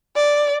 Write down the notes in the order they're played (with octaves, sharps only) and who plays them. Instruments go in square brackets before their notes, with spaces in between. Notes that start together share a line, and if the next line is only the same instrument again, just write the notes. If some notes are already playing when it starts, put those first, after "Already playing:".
[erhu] D5